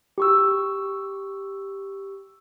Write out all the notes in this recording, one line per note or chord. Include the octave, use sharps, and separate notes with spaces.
G4 C#6 E6